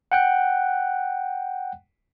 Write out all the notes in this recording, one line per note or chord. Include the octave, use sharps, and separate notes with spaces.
F#5 G5 F#6